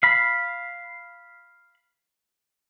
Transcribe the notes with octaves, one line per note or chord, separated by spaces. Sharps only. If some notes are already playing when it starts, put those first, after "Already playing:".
F5 B5